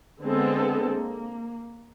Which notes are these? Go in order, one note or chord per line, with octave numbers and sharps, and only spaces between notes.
D3 G#3 B3 C4 G#4 A4
A#3